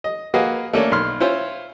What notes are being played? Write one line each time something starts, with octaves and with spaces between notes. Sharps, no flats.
D#5
A#3 F#4 G#4 B4 D#5 F5
A3 A#3 C#4 D4
B1 B5 C6 F6
C#4 E4 F4 C5